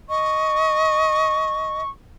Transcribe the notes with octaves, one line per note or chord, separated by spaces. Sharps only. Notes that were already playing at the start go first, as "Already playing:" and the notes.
D#5 C#6